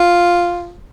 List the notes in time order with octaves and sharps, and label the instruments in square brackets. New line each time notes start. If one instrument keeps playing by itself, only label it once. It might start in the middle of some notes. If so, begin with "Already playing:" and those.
Already playing: [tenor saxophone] F4